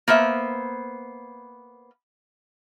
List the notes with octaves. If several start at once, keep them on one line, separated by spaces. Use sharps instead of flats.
A#3 B3 C5 E5